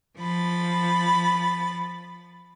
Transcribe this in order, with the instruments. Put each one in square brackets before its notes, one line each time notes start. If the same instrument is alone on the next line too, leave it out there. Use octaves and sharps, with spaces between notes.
[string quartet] F3 B5 A6